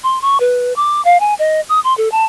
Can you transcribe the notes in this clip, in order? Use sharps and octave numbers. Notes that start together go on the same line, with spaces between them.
C6
C#6
B4
D6
F5
G#5
D#5
D#6
C6
A4
A5